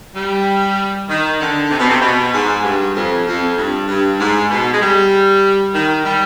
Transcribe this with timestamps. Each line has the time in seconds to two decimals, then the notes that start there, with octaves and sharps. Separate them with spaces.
0.15 G3
1.09 D#3
1.40 D3
1.70 C3
1.80 B2
1.89 C3
2.01 B2
2.33 G#2
2.64 G2
2.95 F2
3.26 F2
3.57 G2
3.88 G2
4.19 G#2
4.50 B2
4.73 G#3
4.81 G3
5.74 D#3
6.05 G3